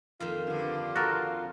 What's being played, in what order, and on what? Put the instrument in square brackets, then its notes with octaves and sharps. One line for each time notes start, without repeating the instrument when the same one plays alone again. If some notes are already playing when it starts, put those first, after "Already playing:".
[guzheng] F2 D#3 A#3 [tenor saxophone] F4
[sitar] G2 D3
[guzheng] C4 [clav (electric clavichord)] F#4 A4 A#4